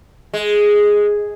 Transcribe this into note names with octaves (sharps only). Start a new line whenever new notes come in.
G#3